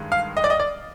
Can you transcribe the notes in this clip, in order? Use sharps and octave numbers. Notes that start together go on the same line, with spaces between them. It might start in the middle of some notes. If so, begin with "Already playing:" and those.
Already playing: G2 D#3 G#3
F5
D#5
D5
D#5
D5